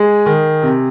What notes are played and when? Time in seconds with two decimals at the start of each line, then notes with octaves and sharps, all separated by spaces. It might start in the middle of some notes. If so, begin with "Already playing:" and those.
Already playing: G#3 G#4
0.26 D#3
0.63 C3